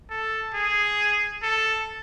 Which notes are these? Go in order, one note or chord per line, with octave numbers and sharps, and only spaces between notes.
A4
G#4
A4